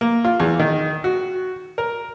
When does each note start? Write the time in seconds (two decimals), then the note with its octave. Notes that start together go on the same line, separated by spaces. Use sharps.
0.01 A#3
0.25 F4
0.40 E2
0.59 D#3
1.04 F#4
1.78 A#4